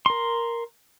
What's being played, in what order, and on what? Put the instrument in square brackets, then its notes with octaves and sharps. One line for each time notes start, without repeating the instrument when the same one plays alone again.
[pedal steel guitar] A#4 C6